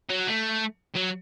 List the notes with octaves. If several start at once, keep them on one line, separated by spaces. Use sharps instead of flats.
F#3
A3
F#3